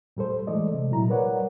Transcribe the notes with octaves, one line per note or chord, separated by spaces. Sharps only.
A2 G3 A4 C5
E3 G#3 A3 A4 D5 D#5
C3
A#2 F#3 E4 A#5
G3 A#4 B4 C#5 D5 F#5